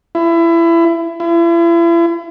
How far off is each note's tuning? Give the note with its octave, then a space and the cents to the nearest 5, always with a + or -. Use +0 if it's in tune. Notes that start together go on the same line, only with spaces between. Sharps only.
E4 +25
E4 +40